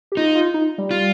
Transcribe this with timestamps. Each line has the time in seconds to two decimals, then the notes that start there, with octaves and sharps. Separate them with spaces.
0.12 G4
0.17 D#4 F4
0.35 F4
0.54 D#4
0.78 G3
0.91 F4